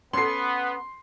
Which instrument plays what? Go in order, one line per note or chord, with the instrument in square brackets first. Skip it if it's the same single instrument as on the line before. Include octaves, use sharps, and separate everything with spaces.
[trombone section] B3 [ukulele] C#4 A4 [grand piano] C6 C7